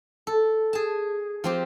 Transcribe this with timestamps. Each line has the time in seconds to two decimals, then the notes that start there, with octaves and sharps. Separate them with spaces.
0.27 A4
0.73 G#4 A5
1.44 F3 C4 G4